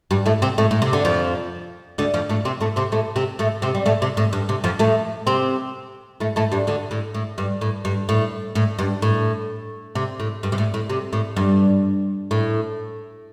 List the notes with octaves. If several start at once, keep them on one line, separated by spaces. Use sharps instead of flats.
G2 G3
A2 A3
C3 C4
A2 A3
A2
C3
D3
F2 F3
D2 D3
F2 F3
A2 A3
C3 C4
A2 A3
C3 C4
A2 A3
C3 C4
A2 A3
C3 C4
G3
A2 A3
C3
A2
G2
C3
F2 F3
A2 A3
C3 C4
A2 A3
A2 A3
G2 G3
D2 D3
A2
A2
G2
A2
G2
A2
A2
G2
A2
C3
A2
G2
C3
A2
A2
C3
A2
G2
A2